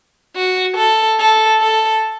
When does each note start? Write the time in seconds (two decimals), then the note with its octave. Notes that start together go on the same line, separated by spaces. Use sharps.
0.36 F#4
0.77 A4
1.19 A4
1.61 A4